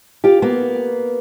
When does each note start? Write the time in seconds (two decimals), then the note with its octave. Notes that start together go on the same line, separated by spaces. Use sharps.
0.24 F4 G4
0.42 A#3 B3